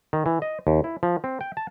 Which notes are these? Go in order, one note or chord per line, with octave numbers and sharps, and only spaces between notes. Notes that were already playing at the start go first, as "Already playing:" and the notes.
D#3
E3
D#5
D#2
E4
F3
C4
G5
A5